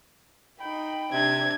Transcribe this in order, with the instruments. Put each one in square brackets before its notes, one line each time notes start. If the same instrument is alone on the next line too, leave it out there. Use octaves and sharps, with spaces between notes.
[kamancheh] D#4 B5 [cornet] G5
[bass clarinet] C3 [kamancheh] C4 D4 [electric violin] G#6